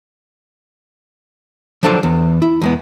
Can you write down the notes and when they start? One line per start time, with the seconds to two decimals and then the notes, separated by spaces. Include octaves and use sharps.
1.83 F3 F#3 D4 A4 C5 D5
2.03 E2
2.42 E4
2.61 E2 G#3 B3